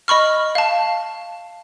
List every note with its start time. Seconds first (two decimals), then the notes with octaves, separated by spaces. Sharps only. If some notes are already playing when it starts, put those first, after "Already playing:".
0.08 D#5 B5 C#6 F6
0.55 F5 A5